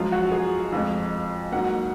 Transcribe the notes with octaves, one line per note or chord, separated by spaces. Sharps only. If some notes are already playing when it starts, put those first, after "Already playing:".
Already playing: F#2 F3 G#3 F4
F#4
G#4
F2 F3 G#3
G#2 F#3 A#3 F#5